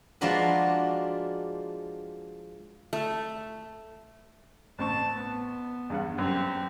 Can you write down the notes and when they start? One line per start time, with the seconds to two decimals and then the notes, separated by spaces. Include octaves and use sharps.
0.21 F3 G#3 A#3 D4 F#4 B4
2.93 A3
4.79 A1 C4 A5 C#6
5.15 B3
5.90 E2 G2 F#5
6.18 F#2 C4 G4